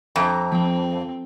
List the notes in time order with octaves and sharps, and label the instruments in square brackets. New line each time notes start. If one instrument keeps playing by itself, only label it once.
[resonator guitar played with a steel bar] F2 [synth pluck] E5 A#5 D6
[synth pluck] F3 G5 [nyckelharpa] C4